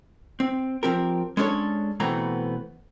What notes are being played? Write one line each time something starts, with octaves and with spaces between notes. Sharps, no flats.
C4
F3 C4 G4 A#4
G#3 C#4 D4 A4 C#5
B2 E3 A3 B3 C4 A#5